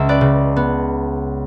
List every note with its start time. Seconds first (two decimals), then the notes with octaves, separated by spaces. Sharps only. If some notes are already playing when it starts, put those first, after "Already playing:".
Already playing: C#2 E5
0.09 B4 D5
0.21 C#3
0.56 B3